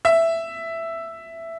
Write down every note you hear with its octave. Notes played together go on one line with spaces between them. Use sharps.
E5